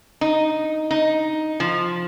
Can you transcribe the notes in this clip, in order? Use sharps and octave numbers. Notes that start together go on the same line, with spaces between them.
D#4
D#4
F3